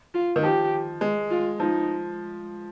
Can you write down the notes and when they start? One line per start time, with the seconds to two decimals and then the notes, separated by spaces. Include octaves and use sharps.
0.14 F4
0.36 D#3
0.42 F3 G4
1.01 G#3
1.31 F4
1.59 F3 D#4